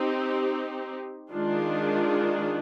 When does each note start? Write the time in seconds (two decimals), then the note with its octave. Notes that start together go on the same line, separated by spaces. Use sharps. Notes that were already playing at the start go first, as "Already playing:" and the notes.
Already playing: C4 D#4 G4
1.32 D#3 G#3 D4 F4